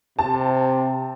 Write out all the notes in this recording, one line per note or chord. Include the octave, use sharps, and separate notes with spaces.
C3 A5